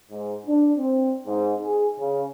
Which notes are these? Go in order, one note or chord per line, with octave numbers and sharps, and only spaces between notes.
G#2
D4
C4
G#2
G#4
C#3